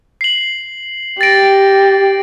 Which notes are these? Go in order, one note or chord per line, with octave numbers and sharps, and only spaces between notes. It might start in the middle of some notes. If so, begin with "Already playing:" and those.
C7 F#7
G4 A6 A#6 D7